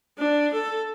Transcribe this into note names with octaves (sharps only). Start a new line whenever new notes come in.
D4
A4